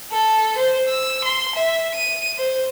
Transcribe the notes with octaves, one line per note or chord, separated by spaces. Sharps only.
A4
C5
E6
C6
E5
D#7
C5